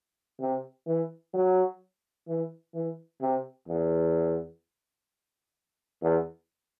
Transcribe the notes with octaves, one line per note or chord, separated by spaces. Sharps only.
C3
E3
F#3
E3
E3
C3
E2
E2